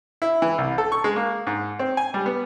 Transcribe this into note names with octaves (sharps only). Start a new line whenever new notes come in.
E4
E3
C2
A4
C#6
G#3
A#3
G#2
C4
G#5
G3
B3